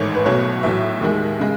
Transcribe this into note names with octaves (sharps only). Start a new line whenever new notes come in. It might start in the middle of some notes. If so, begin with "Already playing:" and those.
Already playing: A1 G#2 D#3 A3 C#5
B4
B1 B2 F#3 A3 C#5
B1 A2 F#3 E5
D#2 D#3 G#3
C#3 G#3